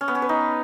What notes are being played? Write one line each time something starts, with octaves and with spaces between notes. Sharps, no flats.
C#4
B3
C#4
B4
D#4